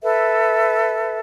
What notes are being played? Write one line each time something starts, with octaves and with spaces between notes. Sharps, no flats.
A4 B4 E5